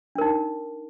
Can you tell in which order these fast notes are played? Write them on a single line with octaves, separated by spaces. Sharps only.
D4 A#4 D#4